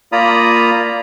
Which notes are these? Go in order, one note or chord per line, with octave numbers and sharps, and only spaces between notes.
A#3 F4 D5 A#5 B5 D#6